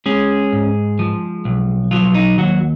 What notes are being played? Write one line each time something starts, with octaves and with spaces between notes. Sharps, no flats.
G#3 C#4 G#4
G#2
F3
B1
F3 F#3 F4
D#4
D#2 F#3 F#4